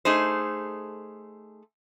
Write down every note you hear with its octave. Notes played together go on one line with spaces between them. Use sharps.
A3 D#4 G#4 C5